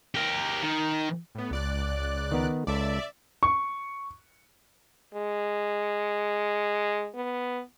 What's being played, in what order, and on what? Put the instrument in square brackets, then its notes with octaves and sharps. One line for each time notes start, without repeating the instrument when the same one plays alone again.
[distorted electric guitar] G4 A#4
D#3
[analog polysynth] A2 B3
C#2 D5 F#6
[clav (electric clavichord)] D#3 B3 A#5
[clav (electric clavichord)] C#2 A4 [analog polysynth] D5 E5
[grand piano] C#6
[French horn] G#3
B3